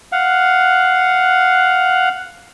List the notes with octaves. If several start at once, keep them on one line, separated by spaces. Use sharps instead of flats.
F5 F#5